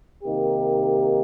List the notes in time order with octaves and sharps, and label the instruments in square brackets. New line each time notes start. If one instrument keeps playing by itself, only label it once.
[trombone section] C3 D#3 A#3 D#4 G4